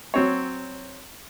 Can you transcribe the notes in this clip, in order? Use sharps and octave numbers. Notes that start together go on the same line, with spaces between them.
F#3 C4 C#5